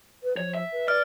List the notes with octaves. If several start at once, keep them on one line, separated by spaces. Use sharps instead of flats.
B4
F3 C#5
E5
B4
D5 F6